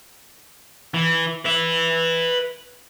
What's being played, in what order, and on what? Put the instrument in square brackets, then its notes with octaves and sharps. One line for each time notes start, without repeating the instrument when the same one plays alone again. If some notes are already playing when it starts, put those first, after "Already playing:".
[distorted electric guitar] E3
B4 E5